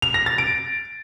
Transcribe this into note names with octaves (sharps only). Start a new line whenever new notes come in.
F7
A#6
A6
D7